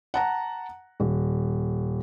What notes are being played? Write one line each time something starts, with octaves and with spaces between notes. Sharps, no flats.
F#5 A5 A#5
D#1